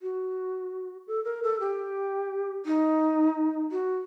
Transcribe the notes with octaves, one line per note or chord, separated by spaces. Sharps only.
F#4
A4
A#4
A4
G4
D#4
F#4